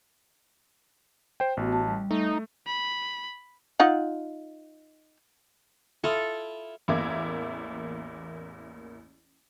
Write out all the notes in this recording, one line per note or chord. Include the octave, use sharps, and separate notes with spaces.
C5 G5
A1 B3 F#4
A5
G3
A3 D#4
B5
D#4 F4 F#5
E4 F4 A4 D#6
A1 E2 A#3 E5 D6 G#6